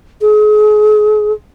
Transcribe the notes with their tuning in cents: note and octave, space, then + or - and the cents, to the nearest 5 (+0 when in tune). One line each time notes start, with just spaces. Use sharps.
G#4 +35